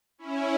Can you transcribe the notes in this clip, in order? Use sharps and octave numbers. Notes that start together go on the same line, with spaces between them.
C#4 E4